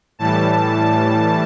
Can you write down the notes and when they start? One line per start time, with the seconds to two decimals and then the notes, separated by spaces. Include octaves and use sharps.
0.19 A2 E3 G3 A5